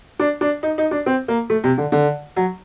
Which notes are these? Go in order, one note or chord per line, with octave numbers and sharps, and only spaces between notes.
D4
D4
D#4
D#4
D4
C4
A#3
A3
C3
D3
D3
F#3